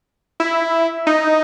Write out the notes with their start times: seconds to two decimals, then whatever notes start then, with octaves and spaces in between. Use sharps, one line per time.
0.40 E4
1.07 D#4